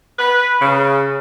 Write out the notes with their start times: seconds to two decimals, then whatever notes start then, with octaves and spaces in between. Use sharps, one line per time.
0.19 B4
0.61 C#3